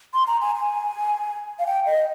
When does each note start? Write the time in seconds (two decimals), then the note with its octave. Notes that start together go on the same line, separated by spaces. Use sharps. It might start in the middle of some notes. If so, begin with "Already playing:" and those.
0.14 C6
0.27 A#5
0.41 G#5
0.56 G#5
1.59 F5
1.67 G5
1.86 D#5